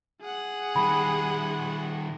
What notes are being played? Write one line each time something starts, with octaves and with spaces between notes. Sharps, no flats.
G#4 F#5
D#3 G3 B5